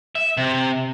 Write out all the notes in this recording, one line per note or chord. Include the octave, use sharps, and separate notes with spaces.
E5
C3